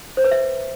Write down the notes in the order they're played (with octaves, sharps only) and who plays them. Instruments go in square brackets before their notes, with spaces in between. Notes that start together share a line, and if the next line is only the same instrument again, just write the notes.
[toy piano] C5
B4
E5